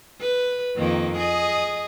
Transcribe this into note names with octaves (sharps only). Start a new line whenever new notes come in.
B4
F2 D#3 A#3
G#4 D#5